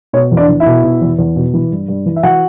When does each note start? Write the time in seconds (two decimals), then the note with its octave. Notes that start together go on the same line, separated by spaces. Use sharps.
0.13 B2 C#5
0.32 E2
0.37 D4 D5
0.49 E2
0.60 E4 E5
0.66 B2
0.84 B2
1.02 E2
1.19 E2
1.36 B2
1.54 E3
1.71 G2
1.88 G2
2.06 E3
2.16 E5
2.23 E3 F#4 F#5